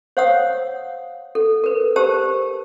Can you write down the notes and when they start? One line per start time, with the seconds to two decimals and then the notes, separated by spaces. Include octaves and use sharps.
0.17 C5 C#5 F5 F#5 D#6 E6
1.35 A4
1.64 A#4 B4
1.96 G4 A#4 C5 A5 E6